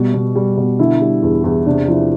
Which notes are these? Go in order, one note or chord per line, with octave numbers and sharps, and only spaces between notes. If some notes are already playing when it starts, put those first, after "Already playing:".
Already playing: B2 G3
B2
G3
B2
D3 E4
G3
E2
E2
C3 D4
F3 E4